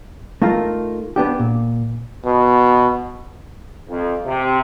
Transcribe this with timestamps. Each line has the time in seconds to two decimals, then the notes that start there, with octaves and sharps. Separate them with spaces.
0.42 A3 D#4 F4 A#4
1.16 B3 D4 G4
1.39 A#2
2.25 B2
3.89 F2
4.25 C3